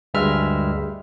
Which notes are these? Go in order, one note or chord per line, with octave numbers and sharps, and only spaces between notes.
D2 G2 G3 G#3 E5 F6